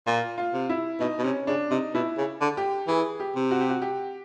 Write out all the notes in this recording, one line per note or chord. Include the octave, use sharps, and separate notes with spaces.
A#2 F4
F4
C3
E4
B2 D#4
B2
C3 C#4
C#3 D4
C3 D#4
B2 E4
C#3
D3
G4
E3 G#4
G4
C3
F#4
G4
F#4
G4